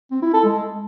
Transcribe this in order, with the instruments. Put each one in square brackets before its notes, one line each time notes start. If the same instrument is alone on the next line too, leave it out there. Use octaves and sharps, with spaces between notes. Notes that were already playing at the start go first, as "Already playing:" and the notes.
[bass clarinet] C4
E4
A4
G#3